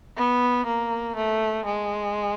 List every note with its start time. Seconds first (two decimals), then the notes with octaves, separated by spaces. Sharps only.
0.17 B3
0.66 A#3
1.16 A3
1.65 G#3